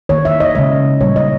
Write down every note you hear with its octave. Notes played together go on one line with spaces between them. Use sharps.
D#3 A#3 C#5
E5
D#5
C#3 G#3 D#5
A#2 G3 A#3 C#5
D#5